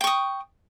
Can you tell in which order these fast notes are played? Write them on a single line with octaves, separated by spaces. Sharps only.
G5 C#6 D#6